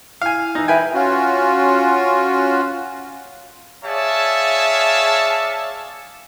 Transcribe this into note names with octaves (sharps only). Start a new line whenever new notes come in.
E4 F5 G#5
E3 D#4
B4 E5 G5 G#5
C#4 F4 F#4
G#4 C#5 D5 E5 F5 A5